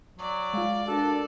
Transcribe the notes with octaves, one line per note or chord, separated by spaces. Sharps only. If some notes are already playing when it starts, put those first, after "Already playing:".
F#3 D5
G#3 F4 F5
D4 F#4 A4 A#4